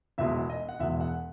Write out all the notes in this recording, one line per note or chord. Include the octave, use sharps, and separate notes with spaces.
E1 E2 B2 G#3 E5
D#5
F#5
E1 E2 B2 G#3 E5
F#5